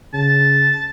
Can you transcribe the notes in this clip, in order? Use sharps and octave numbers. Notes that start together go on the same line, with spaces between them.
C#3 A5